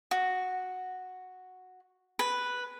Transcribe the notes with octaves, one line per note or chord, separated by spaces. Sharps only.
F#4
B4